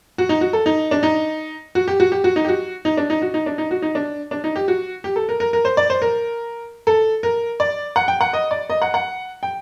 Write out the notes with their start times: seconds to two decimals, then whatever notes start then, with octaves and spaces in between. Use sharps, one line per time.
0.18 F#4
0.29 D#4
0.41 F#4
0.53 A4
0.66 D#4
0.91 D4
1.03 D#4
1.75 F#4
1.88 G4
2.00 F#4
2.12 G4
2.24 F#4
2.36 D#4
2.45 G4
2.48 F#4
2.85 D#4
2.97 D4
3.10 D#4
3.22 F#4
3.34 D#4
3.46 D4
3.58 D#4
3.71 F#4
3.82 D#4
3.95 D4
4.31 D4
4.44 D#4
4.56 G4
4.68 F#4
5.04 G4
5.16 A4
5.29 A#4
5.40 A#4
5.53 A#4
5.65 C5
5.77 D5
5.90 C5
6.02 A#4
6.87 A4
7.23 A#4
7.60 D5
7.96 F#5
8.08 G5
8.21 F#5
8.33 D#5
8.51 D5
8.70 D#5
8.82 F#5
8.94 F#5
9.43 G5